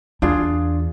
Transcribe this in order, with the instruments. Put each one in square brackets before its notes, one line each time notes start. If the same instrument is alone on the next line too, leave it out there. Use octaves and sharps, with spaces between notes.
[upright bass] E2 [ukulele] D4 F4 G#4